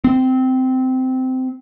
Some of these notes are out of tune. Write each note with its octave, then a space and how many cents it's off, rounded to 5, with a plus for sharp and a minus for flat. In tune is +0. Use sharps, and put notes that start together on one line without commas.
C4 -15